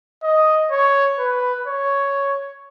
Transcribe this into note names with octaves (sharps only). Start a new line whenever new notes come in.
D#5
C#5
B4
C#5